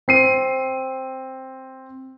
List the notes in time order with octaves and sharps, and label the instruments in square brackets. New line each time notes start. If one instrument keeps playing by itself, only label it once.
[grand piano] C4 C7 D#7